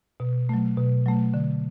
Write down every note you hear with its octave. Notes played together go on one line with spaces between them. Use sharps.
B2
F#3 A3
B2
F#3 A3
D3